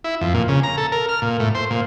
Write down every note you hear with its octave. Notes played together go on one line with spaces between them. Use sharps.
E4
F2
A#2
C#3
A#5
A4
A#4
F6
A#2
A2
C5
A#2